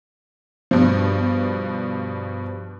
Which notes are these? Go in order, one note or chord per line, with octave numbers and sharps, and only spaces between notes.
G2 B2 F3